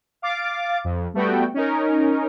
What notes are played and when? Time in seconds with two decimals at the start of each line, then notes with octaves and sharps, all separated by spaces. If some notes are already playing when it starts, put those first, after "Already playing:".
0.22 F5 D6 A6
0.84 F2
1.14 G3 A3 B3 F#4 G5
1.54 C#4 D#4 A#4